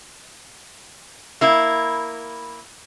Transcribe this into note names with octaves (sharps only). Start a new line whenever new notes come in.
A#3 E4